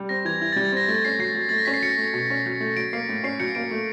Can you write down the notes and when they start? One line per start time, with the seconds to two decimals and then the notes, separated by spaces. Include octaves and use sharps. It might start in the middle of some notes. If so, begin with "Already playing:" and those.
Already playing: G3
0.09 C4 A#6
0.25 E3 G#6
0.41 E4 G#6
0.52 A6
0.56 G3
0.65 A6
0.72 C4 A#6
0.88 A3 A#6
1.05 C#4 C7
1.19 F#3 C7
1.35 F#3
1.49 A3 A6
1.58 A#6
1.65 C#4 B6
1.74 C7
1.83 F#3 C#7
1.98 A3
2.13 B2
2.30 C#4
2.46 F#3
2.61 A3
2.76 F#3 D7
2.93 A#3 C7
3.09 A2
3.24 C#4 C7
3.40 F#3 C#7
3.55 A#3 D7
3.71 A3